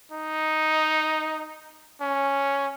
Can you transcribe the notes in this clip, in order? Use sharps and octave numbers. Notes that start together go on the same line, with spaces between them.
D#4
C#4